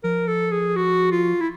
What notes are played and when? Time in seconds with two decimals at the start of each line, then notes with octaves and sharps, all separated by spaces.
0.04 F3 A#4
0.28 A4
0.52 G#4
0.76 F#4
1.11 F4
1.40 E4